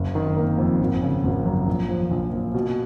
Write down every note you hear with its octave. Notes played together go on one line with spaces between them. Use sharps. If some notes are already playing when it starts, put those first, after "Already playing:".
Already playing: F#1
D#3
A#3
F2
G#1
C#3
G#1
F#2
A#1
F3
A#1
A#2
B2